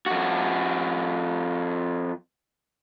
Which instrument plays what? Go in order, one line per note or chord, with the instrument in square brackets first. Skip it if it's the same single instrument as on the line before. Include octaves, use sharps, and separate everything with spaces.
[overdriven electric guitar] F2 F#4